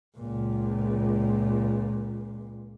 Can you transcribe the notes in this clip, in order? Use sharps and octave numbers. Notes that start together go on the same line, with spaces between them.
C#2 A#2